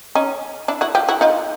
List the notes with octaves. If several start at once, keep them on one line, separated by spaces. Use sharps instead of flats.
C#4 D#4
D4 E4
E4 F#4
F4 G4
E4 F#4
D#4 F4